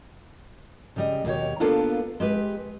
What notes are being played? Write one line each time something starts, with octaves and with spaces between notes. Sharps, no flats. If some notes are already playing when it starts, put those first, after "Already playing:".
C#3 G3 D#5
D#2 B2 G4 C#5
A#3 B3 D4 F4 A4 A#4
G#3 G4 B4